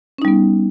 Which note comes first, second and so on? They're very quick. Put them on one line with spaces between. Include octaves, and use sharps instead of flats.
C#4 D#4 G3 B3